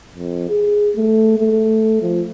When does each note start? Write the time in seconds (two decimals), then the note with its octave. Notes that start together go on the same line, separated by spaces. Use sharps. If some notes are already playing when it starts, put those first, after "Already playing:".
0.15 F2
0.49 G#4
0.96 A3
1.39 A3
2.02 F3